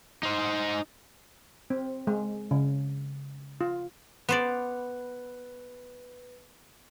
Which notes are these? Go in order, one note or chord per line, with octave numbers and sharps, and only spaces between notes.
D#4 C5
C4
G#3
C#3
F4
B3 B4 C5 D5